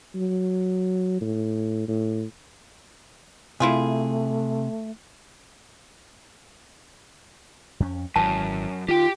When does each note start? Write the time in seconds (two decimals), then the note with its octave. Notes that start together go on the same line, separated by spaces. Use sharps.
0.15 F#3
1.21 A2
1.88 A2
3.60 C3 A3 E4 F4 G#4
7.80 F2 C#4
8.16 G#1 F#2 E3 A5
8.88 D#3 F4 G4 G5